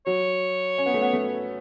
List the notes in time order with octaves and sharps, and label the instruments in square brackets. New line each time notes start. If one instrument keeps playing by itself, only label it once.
[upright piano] F#3 [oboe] C#5
[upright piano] C#4
B3
A3
B3
A3